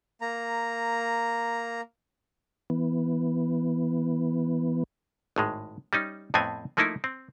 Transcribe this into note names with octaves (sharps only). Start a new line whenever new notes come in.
A#3 A#5
E3 B3
G#1 A2 G#3
G3 C#4 D#4
F2 A2 B3 C4 G#5
F3 A3 A#3 D#4 E4
C4